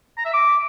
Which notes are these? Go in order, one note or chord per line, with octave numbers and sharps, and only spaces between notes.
A#5
E5
D6